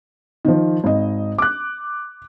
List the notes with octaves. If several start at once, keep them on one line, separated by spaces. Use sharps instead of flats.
D#3 F3
G#1 D#5
D6 F#6